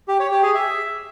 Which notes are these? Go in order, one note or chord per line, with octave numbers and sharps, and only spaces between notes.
G4
C#5
G4
G#4
E5